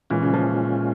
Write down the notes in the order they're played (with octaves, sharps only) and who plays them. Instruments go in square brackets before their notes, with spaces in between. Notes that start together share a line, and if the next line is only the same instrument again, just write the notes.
[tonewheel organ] A#2 G#3 C#4 F4 [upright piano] E3
[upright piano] C#3
F3